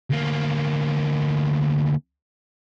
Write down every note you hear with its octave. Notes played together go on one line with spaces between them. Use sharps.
D2 A#3